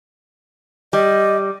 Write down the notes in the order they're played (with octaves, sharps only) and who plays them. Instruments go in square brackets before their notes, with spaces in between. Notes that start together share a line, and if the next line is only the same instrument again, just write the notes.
[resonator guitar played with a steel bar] G3 [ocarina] D#5